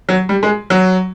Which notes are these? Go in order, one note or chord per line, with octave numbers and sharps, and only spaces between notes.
F#3
G3
G#3
F#3